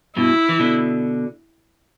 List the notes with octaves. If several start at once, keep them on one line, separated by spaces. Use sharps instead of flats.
G2 B2 E4
E3
B2 D3